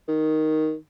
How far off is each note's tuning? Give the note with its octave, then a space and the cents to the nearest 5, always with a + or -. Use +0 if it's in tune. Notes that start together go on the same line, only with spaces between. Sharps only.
D#3 +5